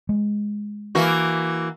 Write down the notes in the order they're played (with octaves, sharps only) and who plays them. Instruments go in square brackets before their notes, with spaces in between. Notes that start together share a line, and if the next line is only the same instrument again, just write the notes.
[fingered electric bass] G#3
[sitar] E3 A#3 F#4